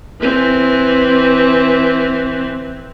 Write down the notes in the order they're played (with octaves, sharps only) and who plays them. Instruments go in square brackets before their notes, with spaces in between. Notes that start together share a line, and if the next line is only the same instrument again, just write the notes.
[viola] E3 C4